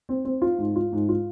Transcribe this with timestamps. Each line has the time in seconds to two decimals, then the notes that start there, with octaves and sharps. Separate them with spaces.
0.09 C4
0.25 C4
0.42 F4
0.58 G#2
0.76 F4
0.92 G#2
1.09 F4